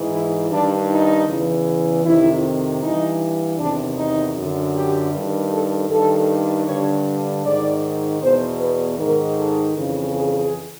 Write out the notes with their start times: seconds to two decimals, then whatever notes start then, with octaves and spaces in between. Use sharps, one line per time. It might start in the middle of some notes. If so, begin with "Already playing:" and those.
Already playing: G#2 E3
0.12 E4
0.50 G2 D#3 D4
0.89 D#4
1.28 E2 C#3 E3
2.04 F2 C3 D#3 E4
2.82 G2 E3 D#4
3.58 E2 C3 D#3 D4
3.97 D#4
4.36 F#2 D3
4.75 G4
5.14 G2 D#3
5.52 A4
5.89 G2 D#3 A4
6.67 G2 D3 C#5
7.45 G#2 D#3 D5
8.21 E2 B2 C5
8.59 B4
8.98 G#2 D#3 A#4
9.38 A4
9.76 F2 C#3 E3
10.15 G#4